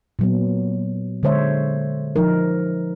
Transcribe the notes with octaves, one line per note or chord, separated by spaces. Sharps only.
A#2 F#3 B3
D3 G#3 C5 C#5 E5
F3 D#4 A#4